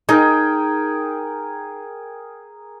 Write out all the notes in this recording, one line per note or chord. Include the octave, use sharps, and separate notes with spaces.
D#4 G#4 A#4 G5